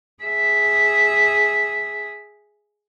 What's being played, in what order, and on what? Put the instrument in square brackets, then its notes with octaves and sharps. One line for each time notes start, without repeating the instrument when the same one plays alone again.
[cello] G#4 E5